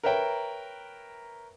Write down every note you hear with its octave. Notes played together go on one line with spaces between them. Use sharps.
A#4 B4 C#5 E5 G5 A#5